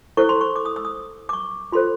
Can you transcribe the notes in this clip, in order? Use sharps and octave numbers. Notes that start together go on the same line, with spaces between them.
E4 A4 C5 C#6
C6
C#6
D6
D#6
E6
D#6
D6
C#6
F4 A4 C5 C6